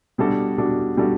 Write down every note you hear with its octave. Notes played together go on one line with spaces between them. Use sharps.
B2 G3 D4 F#4 A4
B2 G3 D4 F#4 A4
B2 G3 D4 F#4 A4